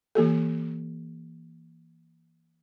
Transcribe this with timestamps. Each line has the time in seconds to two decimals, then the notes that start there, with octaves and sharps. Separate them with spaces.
0.15 E3 A#3 G4 A4